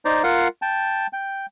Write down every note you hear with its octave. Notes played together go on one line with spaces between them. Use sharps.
D#4 C5 D5 A#5
F4 A#4 F5 F#5
G5 A5
G5